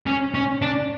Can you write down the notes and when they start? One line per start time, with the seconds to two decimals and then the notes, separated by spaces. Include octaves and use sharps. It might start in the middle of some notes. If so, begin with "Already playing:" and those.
0.07 C#4
0.35 C#4
0.62 D4